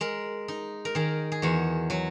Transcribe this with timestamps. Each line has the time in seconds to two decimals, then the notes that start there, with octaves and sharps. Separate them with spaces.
0.01 G#3 A#4
0.48 D#4
0.85 A#4
0.95 D#3 G#4
1.32 G#4
1.42 E2 F#4
1.90 F#3 F#4